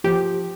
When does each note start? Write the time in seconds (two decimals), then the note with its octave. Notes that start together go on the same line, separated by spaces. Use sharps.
0.04 F3 G4